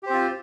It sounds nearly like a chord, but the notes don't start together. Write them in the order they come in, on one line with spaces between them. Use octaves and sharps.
G4 C5 C4 F4